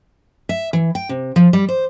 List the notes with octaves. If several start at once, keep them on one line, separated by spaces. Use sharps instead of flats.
E5
E3
G5
C3
F3
G3
C5